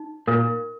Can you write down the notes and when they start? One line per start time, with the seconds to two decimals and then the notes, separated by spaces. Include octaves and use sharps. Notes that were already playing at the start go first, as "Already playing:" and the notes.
Already playing: D#4
0.27 A#2 A#4